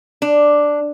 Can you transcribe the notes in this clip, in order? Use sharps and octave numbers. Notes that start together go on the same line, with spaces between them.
D4